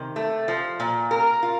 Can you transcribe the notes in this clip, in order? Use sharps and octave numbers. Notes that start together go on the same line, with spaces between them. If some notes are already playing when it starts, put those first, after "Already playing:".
Already playing: C3 D#3
A3
F3
A#2
A#4
F4